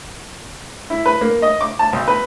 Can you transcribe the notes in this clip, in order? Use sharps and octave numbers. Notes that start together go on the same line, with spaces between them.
E4
B4
A#3
D#5
D6
A5
B1
B4